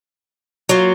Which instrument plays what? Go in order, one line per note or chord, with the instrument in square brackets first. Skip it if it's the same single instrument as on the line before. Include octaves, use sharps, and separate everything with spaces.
[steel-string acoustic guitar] F#3 A#3 F4